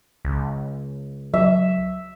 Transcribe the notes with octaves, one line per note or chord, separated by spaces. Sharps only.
C#2
F#3 E5